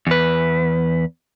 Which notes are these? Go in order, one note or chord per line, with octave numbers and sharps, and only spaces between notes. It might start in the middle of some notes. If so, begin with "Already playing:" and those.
E2 B4